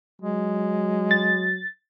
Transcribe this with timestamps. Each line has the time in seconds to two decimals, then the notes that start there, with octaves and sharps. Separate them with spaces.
0.22 F#3 G#3
1.11 A6